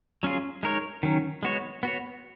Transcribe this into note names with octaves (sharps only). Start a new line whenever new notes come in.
F#3 C#4 F4 G#4
G#3 D#4 A#4 C#5
D#3 F#3 C#4
G#3 B3 F#4 C#5
B3 F#4 C#5